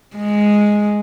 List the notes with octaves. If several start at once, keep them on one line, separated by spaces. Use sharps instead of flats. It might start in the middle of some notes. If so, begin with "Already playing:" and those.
G#3